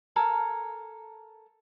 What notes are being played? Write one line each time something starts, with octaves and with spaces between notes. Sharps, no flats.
A4 A#4 G#5